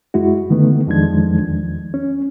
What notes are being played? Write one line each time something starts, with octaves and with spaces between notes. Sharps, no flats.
F#2 G#3 E4 F#4
D3 D#3 A3 B3
F2 D#3 F3 G#3 D4 G#6
E2
C#4